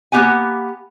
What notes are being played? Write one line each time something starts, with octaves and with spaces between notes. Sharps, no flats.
A#3 B3 D#4 G4 F#5 G#5